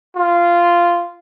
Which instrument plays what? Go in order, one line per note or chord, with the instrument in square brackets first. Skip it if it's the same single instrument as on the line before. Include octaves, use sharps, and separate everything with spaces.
[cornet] F4